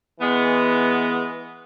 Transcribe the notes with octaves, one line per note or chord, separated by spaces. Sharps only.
E3 G#3 B3